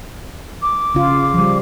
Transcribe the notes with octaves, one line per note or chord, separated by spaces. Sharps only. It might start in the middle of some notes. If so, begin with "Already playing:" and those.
D6
C#3 F4
F3 G3